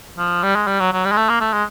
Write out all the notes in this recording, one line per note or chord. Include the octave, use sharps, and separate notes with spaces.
F3
G3
G#3
G3
F#3
F#3
G3
G#3
A3
A#3
A3
G#3